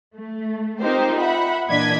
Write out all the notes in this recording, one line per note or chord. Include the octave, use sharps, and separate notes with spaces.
A3
C4 D#4 F4 G4 A#4 C5
E5 F#5 B5
A#2 E3 D4 D#5 G#6 B6